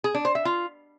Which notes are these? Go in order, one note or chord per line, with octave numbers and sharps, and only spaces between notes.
G#4
D4
C5
E5
F4